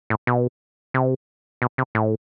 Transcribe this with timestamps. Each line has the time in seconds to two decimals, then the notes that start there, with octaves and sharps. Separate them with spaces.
0.10 A2
0.27 B2
0.94 C3
1.62 B2
1.78 C3
1.95 A2